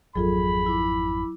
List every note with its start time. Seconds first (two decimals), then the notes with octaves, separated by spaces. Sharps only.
0.16 G#1 F2 F#3 F4 G#4 A4 B5
0.66 E4 D6